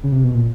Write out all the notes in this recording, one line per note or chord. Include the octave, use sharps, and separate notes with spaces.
C#3
C3
B2
A#2